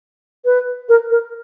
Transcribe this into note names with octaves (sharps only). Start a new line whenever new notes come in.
B4
A#4
A#4